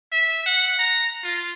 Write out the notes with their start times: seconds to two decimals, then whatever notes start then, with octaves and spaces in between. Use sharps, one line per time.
0.12 E5
0.46 F#5
0.79 A#5
1.24 F4